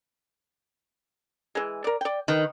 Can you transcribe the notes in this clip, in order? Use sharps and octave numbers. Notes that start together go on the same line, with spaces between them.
E3 G#3
A#4 D5
D5 G5
D#3 B4